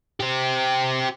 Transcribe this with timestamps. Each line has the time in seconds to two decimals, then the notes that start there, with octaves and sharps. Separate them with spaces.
0.20 C4 G4